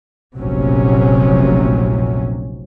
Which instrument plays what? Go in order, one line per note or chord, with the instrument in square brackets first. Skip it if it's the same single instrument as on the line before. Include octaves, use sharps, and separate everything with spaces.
[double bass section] F1 A#1 C3 F#3 C#4